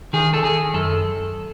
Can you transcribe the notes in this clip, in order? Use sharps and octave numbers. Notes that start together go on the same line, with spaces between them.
D#3 G#4
A4
D#3 G#4
F#2 A4